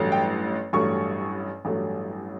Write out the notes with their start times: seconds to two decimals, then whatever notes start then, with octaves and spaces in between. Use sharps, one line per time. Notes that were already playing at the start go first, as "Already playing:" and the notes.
Already playing: A1 G2 F#3 A3
0.12 G5
0.73 A1 G2 F#3 A3 C#6
1.65 A1 G2 F#3 A3